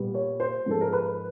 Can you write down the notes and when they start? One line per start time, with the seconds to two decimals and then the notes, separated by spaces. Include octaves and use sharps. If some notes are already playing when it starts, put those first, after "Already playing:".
Already playing: A#2 G3 B3
0.14 C#5
0.40 C5
0.66 G#2 F3 G#3 B3 A4
0.81 A#4
0.93 B4